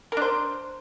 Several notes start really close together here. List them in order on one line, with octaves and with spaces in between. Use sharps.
A#4 D4 C5